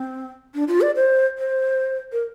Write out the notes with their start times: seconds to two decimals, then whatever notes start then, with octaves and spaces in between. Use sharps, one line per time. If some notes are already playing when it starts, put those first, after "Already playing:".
Already playing: C4
0.54 D4
0.68 F4
0.81 D5
0.96 C5
1.38 C5
2.12 A#4